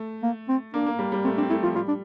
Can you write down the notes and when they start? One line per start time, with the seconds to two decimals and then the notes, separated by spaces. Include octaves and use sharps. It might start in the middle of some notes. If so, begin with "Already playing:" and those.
Already playing: A3
0.23 A#3
0.49 C4
0.74 A#3 D4
0.86 A#3
0.99 G3
1.12 G3
1.24 A3 C4
1.37 C4 D4
1.50 A3 E4
1.63 F3 F4
1.75 G3 F4
1.88 D4